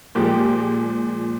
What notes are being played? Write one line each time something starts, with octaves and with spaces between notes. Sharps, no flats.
A#2 F3 G#3 G4